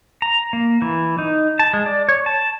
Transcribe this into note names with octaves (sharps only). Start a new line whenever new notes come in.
A#5
A#3
E3
D#4
A5
G#3
D5
C#5
A5